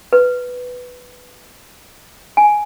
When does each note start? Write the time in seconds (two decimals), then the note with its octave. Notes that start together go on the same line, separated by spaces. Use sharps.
0.13 B4
2.37 G#5